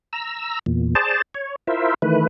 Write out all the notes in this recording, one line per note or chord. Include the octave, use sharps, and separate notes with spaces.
A#5 E6
E2 A#2
G#4 C5 D5 A5
C#5
E4 F4 A#4 C5 E5
D#3 E3 A3 B4